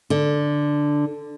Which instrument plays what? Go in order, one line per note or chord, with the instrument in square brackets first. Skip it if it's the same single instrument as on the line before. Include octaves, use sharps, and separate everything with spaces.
[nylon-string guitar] D3